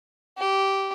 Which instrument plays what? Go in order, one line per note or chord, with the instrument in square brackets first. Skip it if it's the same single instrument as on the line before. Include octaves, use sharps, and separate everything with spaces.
[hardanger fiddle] G4